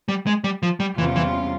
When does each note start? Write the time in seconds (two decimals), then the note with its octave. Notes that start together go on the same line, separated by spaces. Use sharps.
0.08 G3
0.27 G#3
0.44 G3
0.63 F3
0.80 G3
0.98 E2 C3 E3 G3 C#4 F4
1.16 E3